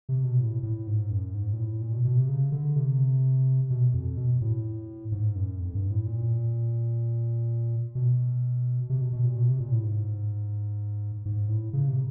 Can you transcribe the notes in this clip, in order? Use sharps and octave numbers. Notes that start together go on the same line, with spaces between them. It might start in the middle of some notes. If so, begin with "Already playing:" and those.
C3
B2
A2
A2
G#2
F#2
G#2
A#2
A2
A#2
B2
B2
C3
C#3
D3
C3
B2
F2
B2
A2
G#2
F#2
F2
G2
A2
A#2
B2
C3
B2
B2
A#2
B2
C3
A#2
A2
G#2
G#2
A2
C#3
C3